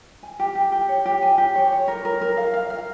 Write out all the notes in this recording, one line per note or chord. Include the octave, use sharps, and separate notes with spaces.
G#5
G4
G4
G4
C#5
G4
G#5
G4
C#5
C#5
A#4
A#4
A#4
F5
F5
F5